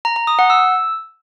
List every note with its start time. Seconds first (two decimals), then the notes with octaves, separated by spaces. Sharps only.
0.05 A#5
0.16 A#5
0.27 D#6
0.39 F#5
0.50 E6